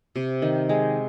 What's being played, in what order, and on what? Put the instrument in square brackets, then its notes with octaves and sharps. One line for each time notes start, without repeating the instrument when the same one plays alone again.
[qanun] C3
D#3
G#3